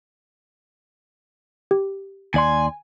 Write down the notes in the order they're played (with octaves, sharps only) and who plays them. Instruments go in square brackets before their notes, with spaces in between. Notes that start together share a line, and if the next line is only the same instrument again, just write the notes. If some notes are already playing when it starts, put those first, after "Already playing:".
[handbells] G4
[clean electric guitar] D#2 D5 C6 [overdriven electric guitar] G#5